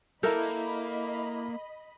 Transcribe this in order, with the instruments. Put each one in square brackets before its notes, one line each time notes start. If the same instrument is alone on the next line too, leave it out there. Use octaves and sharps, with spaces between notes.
[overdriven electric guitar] A#3 [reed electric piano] E4 E5 G6 [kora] A4 A#4 [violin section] D#5 B5